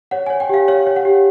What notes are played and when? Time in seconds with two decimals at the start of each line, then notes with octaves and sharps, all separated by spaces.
0.11 C#5 F#5
0.27 G#5
0.30 C#5
0.40 G5
0.49 G4 F5
0.68 C#5 F5
0.87 C#5
0.96 F#5
1.05 G4